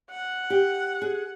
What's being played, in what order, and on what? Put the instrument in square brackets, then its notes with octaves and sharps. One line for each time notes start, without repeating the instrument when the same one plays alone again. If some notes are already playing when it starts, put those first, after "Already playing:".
[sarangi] F#5
[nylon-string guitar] G4
G#4